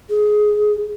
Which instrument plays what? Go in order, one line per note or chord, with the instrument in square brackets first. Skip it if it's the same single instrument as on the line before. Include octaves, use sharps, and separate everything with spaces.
[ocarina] G#4